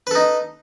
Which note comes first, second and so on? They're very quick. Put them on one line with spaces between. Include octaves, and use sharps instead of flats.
B4 A4 D#4